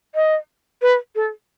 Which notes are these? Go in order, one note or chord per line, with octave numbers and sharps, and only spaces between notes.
D#5
B4
A4